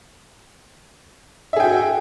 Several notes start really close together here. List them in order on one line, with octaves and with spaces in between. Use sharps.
E5 G#4 G5 F#4